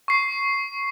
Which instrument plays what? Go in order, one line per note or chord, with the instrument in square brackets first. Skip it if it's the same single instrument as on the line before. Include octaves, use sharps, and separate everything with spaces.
[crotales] C#6 C7